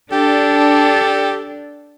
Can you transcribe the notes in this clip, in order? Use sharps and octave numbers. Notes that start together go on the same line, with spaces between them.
D4 G4 A4